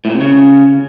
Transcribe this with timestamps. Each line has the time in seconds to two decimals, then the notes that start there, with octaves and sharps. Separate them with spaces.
0.05 A2
0.10 A#2
0.15 C3
0.21 C#3